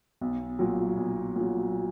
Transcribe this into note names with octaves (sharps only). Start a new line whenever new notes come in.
B1
A#2 F#3
B1
A#2 F#3